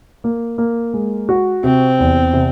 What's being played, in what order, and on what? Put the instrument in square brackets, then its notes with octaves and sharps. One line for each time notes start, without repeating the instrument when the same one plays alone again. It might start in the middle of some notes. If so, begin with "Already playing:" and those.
[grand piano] A#3
A#3
G#3
F#4
[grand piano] C3 [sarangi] C4
[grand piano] E2
C3